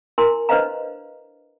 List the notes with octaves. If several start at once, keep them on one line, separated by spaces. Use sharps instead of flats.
E4 A#4 G#5 C6
D4 B4 C5 D#5 F5 A#5